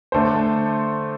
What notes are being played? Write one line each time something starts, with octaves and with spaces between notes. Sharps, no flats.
D3 A3 D4 A4 C5